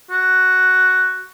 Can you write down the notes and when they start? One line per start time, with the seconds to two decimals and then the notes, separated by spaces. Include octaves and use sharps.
0.11 F#4